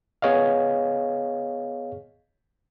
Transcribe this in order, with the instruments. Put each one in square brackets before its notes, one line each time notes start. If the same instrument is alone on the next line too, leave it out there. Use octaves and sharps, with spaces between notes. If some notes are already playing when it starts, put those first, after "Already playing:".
[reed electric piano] B3 G#4 C#5 D#5 F5